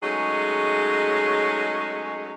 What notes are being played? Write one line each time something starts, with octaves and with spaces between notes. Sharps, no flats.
F#3 G#3 A3 C#4 D#4 G#4